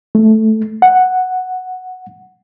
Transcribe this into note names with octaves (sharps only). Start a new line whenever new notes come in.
A3
F#5